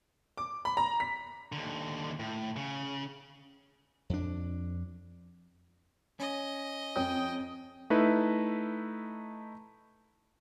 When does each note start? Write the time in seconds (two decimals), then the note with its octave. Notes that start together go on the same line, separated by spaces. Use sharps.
0.37 D6
0.65 B5
0.77 A#5
1.00 B6
1.52 D#2 D3
2.19 A2
2.56 C#3
4.10 F2 D4
6.20 C#4 D#5
6.96 F2 C#5 G5 D#6
7.90 A3 D#4 E4 B4